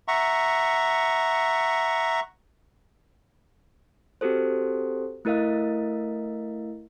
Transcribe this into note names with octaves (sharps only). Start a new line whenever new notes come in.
E5 F#5 A#5 C#6
C4 F#4 G4 A4 C5
A3 E4 A#4 D#5 F5